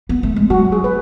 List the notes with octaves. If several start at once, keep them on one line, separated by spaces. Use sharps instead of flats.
B3
A3
G#3
F#3 F#4
G#4
B4